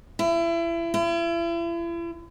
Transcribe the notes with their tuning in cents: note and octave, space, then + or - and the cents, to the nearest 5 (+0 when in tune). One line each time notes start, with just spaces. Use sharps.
E4 +30
E4 +40